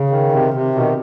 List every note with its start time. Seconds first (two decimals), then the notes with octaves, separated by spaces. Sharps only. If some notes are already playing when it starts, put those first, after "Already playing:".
Already playing: C#3
0.09 D#3
0.32 C3
0.54 C3
0.75 B2 D#3